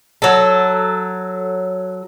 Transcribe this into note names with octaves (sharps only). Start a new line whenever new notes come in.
F#3 A4